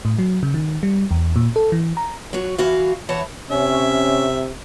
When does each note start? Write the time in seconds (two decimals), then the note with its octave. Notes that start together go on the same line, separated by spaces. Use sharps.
0.05 A2
0.19 F#3
0.43 C#3
0.54 D#3
0.83 G3
1.11 E2
1.36 A#2
1.56 A4
1.72 E3
1.97 A#5
2.33 F#3 F#4
2.58 E3 F#4 F5
3.09 E3 C#5 F#5 A5
3.51 C3 C#4 E5